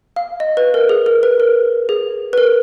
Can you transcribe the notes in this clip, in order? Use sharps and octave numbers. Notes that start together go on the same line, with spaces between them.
F5
D#5
B4
A#4
G#4
A#4
B4
A#4
G#4
B4
A#4